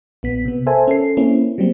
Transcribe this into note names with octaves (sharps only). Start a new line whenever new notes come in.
A#1 B3 B6
C3 B3
A4 A#4 C5 E5 G#5 A5
C#4 A4 C7
A#3 C4 C#4 E4
F#3 G3 A#3 C4